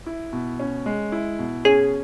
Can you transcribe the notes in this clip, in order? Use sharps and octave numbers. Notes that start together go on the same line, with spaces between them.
E4
B2
C#4
G#3
E4
B2
C#4 G#4